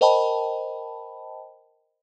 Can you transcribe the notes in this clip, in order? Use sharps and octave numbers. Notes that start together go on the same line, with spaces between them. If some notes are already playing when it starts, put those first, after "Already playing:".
A#4 C5 D#5 G5 A5 B5